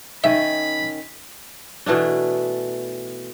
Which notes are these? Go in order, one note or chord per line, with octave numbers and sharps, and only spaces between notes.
D#3 C#4 D#5 E5 B5
B2 E3 A3 D4